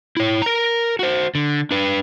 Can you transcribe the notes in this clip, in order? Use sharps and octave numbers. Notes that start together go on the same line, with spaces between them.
E4 C#5
A#4 A#5
F#4 C5
D3
D4 B4